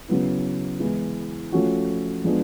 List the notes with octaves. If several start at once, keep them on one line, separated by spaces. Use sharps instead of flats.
C#3 F#3 B3 E4
E3 G#3 B3 E4
F3 A3 C#4 F#4
F3 G#3 B3 D4